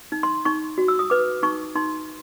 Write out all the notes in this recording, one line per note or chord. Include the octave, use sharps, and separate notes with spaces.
D#4
C6
D#4 C#6
F#4
E6
D#6
B4 D6
D#4 C#6
D#4 C6